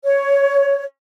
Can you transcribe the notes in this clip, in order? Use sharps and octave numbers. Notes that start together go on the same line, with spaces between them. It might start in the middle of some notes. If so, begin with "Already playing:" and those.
C#5